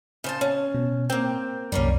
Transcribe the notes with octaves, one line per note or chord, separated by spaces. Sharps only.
C#3 C5 A5
C#4
B2
A#3 C4 G5
C2 F#2 G3 A#3 C#4